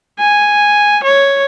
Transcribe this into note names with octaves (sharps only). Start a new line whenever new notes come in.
G#5
C#5